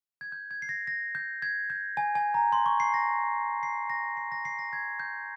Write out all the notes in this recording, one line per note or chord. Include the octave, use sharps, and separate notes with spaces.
G#6
G6
G#6
C7
A#6
A#6
G6
G#6
G6
G#5
G#5
A#5
C6
C#6
C7
A#6
C7
A#6
C7
A#6
C7
A#6
G#6
G6